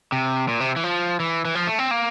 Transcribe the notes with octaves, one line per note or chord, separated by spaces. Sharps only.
C3
A#2
C3
E3
F3
E3
E3
F3
A3
C4
A#3